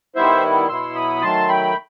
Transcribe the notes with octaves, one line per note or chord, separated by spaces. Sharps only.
D#3 G3 B3 E4 C5 E5
B2 F#3 B3 E4 C6 E6
B5 D#6
D#3 F#3 A3 A5 C6
G5 B5